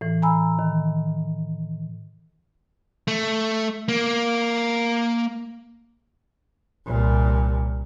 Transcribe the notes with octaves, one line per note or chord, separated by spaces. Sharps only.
A2 E3
G#5 A#5 B5 E6
D#3
A3
A#3
C2 A#2